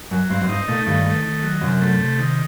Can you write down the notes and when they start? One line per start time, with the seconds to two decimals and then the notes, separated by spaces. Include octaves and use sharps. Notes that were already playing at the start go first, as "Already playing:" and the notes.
0.11 F#2 F#3
0.30 G2 C4
0.41 F#2
0.49 G2 D#4
0.68 A#2 A3
0.86 G2 D#3
1.06 A3
1.25 D#3
1.43 F#3
1.61 F#2 C3
1.81 A3
1.99 C3
2.19 D#3